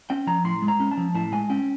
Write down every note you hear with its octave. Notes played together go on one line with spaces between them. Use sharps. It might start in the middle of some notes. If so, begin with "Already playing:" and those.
C#4 G5
F3 A#5
A2 C6
G#3
A#5
C#4
A5
F3
A2 A5
G#3 G#5
C#4 G5